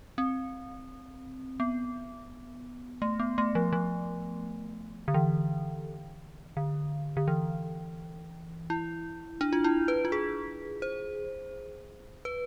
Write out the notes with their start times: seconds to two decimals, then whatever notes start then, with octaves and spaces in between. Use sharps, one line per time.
0.18 C4
1.60 B3
3.02 A3
3.20 B3
3.38 A3
3.55 F3
3.73 F3
5.08 D3
5.14 E3
6.57 D3
7.17 D3
7.28 E3
8.70 E4
9.41 D4
9.53 F4
9.64 E4
9.88 B4
10.05 F4
10.12 G#4
10.82 C5
12.25 B4